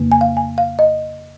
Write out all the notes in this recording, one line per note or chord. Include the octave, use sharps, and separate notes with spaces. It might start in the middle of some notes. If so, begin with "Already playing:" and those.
Already playing: F2 C#3 A#3
G#5
F5
G#5
F5
D#5